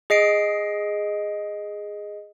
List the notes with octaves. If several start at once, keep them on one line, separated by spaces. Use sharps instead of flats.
G#4 D#5 C7 D7